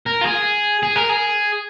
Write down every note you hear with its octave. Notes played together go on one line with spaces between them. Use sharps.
A#4
F4
G#4
G#4
A#4
G#4